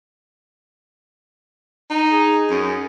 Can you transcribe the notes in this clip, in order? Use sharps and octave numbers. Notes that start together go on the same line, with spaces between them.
D#4
G#4
F#2